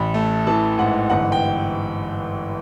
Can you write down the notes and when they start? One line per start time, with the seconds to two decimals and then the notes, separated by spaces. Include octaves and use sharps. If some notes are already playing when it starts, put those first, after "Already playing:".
Already playing: A1 B5
0.14 A3
0.47 E3 A5
0.78 G#2 F#5
1.10 G1 F#5
1.32 G5